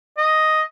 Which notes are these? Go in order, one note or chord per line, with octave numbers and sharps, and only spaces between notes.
D#5